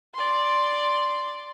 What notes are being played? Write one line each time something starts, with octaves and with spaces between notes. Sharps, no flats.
D5 C6